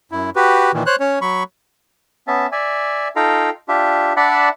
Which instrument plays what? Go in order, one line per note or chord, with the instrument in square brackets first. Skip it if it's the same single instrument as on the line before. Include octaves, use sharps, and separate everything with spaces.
[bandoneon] F#2 E4
F#4 G4 B4
A#2 D#3 E3
C5 C#5 F#6
C#4 C#5
F#3 B5 C#6
[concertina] B3 C#4 E5 A5
D5 E5 G#5
D#4 F4 A4 F5 G5 A#5
D4 F4 G4 E5
D4 D5 E5 F#5 A5 B5